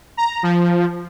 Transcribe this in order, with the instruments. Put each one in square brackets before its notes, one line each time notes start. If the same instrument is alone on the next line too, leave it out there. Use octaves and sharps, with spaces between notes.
[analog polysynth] A#5
F3